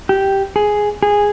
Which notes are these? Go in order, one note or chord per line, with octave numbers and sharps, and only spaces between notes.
G4
G#4
G#4